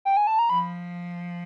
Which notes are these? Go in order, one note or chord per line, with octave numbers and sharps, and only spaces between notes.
G5
G#5
A5
A#5
F3 B5